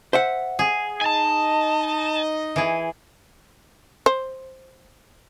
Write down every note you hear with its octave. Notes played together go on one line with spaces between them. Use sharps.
C5 E5 F#5
G#4
D#4 D#5 G#5 A5
E3 G#4
C5